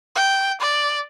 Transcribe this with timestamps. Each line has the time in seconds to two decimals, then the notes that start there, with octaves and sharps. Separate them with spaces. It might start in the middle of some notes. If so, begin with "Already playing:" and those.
0.15 G5
0.60 D5